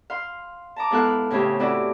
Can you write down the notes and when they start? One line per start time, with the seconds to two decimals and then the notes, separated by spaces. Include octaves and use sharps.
0.10 F5 C6
0.76 A5 A#5 D6
0.91 G#2 B3 E4 A4 F5 F#6
1.30 A2 C#3 C4 C#4 G4
1.59 A3 C4 E4 F#4 D5